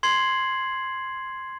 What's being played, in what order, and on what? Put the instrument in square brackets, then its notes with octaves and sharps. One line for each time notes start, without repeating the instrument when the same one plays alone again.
[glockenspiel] C6 G#6 C7 F#7